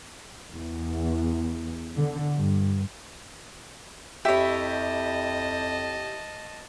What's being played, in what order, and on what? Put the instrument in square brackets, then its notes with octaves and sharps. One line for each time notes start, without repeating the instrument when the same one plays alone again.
[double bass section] E2
D3
G2
[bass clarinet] F2 [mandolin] E4 C#5 [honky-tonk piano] G4 [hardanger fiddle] D#5 A5